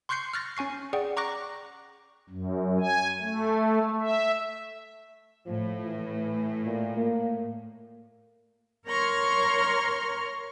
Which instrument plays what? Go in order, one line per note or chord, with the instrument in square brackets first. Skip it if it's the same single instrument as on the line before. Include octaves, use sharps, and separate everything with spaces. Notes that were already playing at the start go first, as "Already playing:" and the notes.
[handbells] C6 C#6 F#6 G6 C7 C#7
F6 F#6 A6 A#6
C#4 G#5 C#6 C7
G#4 D5 F#5 G5
A#5 C#6 D6 F#6 A#6
[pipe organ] F#2
G#5
A3
E5
[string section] A2 [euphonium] F3
[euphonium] E3
A#2
A#3
[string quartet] A#4 C#5 A#5 C6 C#6 F6